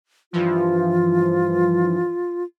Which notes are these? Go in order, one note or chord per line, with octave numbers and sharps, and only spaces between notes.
G2 E3 F3 F4